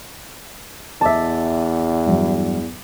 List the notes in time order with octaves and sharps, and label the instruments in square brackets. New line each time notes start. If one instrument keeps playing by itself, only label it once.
[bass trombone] E2 [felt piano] D#5 D6 [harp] E5 A5
[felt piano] G2 E3 F#3